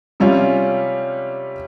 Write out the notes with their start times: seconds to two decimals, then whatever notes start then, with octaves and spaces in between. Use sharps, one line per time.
0.20 C3 G3 C#4 F4